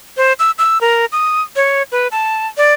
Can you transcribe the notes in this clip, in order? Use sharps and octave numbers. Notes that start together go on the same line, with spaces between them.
C5
E6
E6
A#4
D#6
C#5
B4
A5
D5